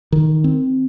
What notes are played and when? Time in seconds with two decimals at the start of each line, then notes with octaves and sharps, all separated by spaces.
0.12 D#3
0.44 C4